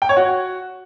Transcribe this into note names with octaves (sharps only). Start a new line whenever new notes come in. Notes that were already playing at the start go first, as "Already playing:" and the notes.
G5
C#5
F#4